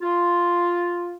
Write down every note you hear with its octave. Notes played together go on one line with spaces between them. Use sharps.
F4